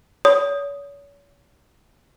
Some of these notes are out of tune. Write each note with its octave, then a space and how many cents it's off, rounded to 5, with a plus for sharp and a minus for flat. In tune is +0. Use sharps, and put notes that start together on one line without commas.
C#5 +40 D#6 +0